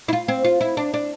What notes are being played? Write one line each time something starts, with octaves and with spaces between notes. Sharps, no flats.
E4
F4
C4
F4
E4
D4
D4